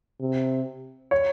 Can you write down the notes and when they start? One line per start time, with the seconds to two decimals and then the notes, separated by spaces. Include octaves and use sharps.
0.20 C3
1.11 C#5